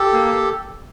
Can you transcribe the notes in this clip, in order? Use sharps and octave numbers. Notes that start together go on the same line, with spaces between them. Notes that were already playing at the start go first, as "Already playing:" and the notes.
Already playing: G4 A4
A#3